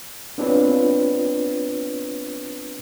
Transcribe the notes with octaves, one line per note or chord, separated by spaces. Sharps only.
B3 C4 D4 F4 B4 C#5